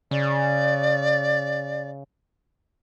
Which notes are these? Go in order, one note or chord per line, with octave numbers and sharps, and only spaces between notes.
C#3 D5